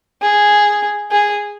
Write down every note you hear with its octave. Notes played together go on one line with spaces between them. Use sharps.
G#4
G#4